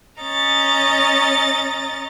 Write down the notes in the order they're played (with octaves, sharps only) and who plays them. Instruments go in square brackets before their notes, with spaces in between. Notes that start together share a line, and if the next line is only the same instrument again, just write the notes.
[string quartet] C#4 D#5 A#5 A6